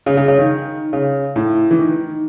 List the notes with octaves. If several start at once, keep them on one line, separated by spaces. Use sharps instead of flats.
C#3
C#3
C#3
D#3
C#3
A2
E3
D#3